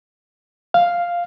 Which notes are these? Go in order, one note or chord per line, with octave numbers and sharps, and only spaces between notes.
F5